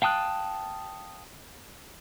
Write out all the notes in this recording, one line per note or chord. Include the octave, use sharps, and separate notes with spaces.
F5 G5 A5 D#6 F#6